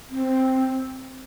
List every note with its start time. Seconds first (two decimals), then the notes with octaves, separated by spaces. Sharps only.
0.11 C4